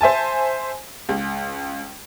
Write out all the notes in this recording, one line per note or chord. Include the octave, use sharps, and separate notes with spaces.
C5 E5 G#5 A5
C#2